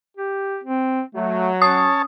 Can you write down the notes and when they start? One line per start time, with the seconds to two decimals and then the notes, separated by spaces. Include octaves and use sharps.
0.17 G4
0.64 C4
1.15 F#3 A3
1.62 C#4 C#5 A5 D#6